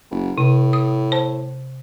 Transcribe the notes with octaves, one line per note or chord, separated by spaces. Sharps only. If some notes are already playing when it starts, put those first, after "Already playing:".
F#1
A2 C3
D#6
C5 A5